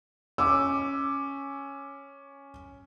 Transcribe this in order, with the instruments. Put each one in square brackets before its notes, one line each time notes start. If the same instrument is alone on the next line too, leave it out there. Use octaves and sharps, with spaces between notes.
[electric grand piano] C#4 [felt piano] D6 E6